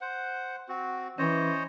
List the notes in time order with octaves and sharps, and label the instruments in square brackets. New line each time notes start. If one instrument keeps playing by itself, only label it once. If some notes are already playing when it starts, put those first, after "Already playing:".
[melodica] C5 F#5
C4 F#4
[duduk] E3 [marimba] C#4 [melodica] C5 C#5 D#5